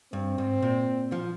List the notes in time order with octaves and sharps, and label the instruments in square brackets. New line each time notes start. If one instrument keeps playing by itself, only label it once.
[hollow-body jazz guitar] G2 [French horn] C4
[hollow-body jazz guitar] G#2
A#2
F3